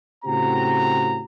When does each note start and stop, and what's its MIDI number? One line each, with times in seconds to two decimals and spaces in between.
0.25 1.24 45
0.25 1.24 49
0.25 1.24 60
0.25 1.24 66
0.25 1.24 67
0.25 1.24 82